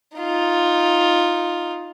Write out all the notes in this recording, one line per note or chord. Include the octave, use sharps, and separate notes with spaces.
D#4 F4